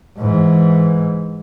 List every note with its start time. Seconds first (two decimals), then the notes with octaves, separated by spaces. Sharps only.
0.17 G#2 E3